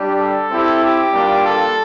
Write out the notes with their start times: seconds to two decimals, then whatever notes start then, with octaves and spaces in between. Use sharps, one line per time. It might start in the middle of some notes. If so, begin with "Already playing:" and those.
Already playing: G3 D4 G4
0.19 A4
0.51 C4 E4 G4
0.82 G4
1.13 G3 A#3 D4 F4
1.45 A4